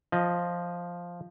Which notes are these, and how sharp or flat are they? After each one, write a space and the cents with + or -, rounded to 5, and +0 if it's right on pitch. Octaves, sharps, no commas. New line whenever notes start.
F3 +0 D#5 +0